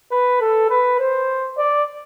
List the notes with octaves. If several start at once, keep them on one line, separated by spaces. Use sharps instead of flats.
B4
A4
B4
C5
D5